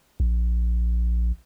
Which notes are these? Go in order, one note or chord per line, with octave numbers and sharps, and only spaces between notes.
A#1